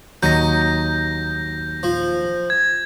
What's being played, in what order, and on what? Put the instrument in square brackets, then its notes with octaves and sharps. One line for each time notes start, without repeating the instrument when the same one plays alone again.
[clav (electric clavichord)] D#2 F#3 [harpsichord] D#4 [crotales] G6 A#6
[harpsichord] F3
[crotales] G#6